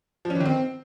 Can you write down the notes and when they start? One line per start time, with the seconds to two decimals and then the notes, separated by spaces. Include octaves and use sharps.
0.25 F3
0.30 C#4
0.35 E3
0.40 D#3
0.45 C4